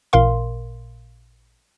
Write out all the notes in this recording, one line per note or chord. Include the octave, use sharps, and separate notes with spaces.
A1 A#2 A#4 F5 C6